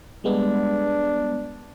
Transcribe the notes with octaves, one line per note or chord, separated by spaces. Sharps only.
G3 G#3 B3 D4